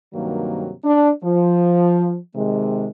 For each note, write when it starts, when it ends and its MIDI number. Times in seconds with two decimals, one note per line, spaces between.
0.14 0.72 43
0.14 0.72 48
0.14 0.72 51
0.14 0.72 54
0.14 0.72 58
0.84 1.09 62
1.24 2.17 53
2.35 2.87 48
2.35 2.87 51
2.35 2.87 56